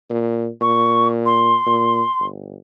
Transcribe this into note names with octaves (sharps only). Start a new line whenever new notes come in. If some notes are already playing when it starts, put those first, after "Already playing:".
A#2
A#2 C#6
C6
A#2
G1